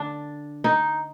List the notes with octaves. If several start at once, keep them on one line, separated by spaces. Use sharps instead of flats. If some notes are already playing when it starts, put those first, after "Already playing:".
Already playing: D3 D4
D#4